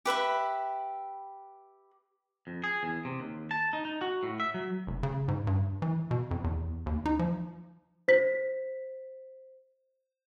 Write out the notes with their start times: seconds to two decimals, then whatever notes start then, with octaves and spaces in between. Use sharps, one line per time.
0.05 G4 B4 E5 B5
2.47 F2
2.64 G#4
2.83 E2
3.05 C3
3.20 D#2
3.51 A5
3.73 D#4
3.85 D#4
4.01 F#4
4.23 A2
4.40 E5
4.54 F#3
4.87 F1
5.03 C#3
5.28 G#2
5.47 G2
5.82 E3
6.11 B2
6.31 F2
6.44 E2
6.86 D#2
7.06 D#4
7.19 F3
8.08 C5 B6